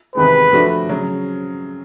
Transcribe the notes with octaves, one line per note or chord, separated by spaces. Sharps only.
E2 C3 D#3 G#3 B4
F3 A3 D4 F#4
C#3 F#3